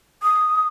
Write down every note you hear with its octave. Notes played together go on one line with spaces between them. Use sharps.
D#6